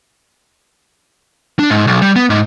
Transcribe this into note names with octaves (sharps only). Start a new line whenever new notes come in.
D4
G#2
B1
G3
B3
G#2